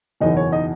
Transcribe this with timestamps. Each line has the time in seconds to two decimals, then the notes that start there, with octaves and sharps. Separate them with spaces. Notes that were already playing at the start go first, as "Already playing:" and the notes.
0.20 F#1 E2 B2 D#4 D#5
0.37 C#5
0.52 D#4 D#5